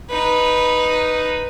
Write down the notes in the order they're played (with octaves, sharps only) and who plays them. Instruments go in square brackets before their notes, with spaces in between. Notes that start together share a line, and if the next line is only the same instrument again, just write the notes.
[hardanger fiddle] D#4 B4